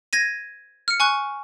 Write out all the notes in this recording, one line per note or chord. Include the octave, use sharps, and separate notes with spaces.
G#6 A#6 D#7
F6 C#7
G#5 C#6 F#6